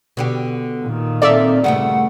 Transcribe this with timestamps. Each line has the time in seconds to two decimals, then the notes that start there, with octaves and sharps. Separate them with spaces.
0.17 B2 D3 G4
0.84 A#2 D#3
1.22 C4 A4 D5 E5 F5
1.64 G2 C#3 A3 F#5